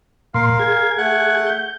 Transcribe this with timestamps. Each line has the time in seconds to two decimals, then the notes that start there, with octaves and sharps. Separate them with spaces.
0.34 A#2 A#4 F5 C6
0.59 G#4 G#6
0.98 A3 F#5 F#6
1.46 G6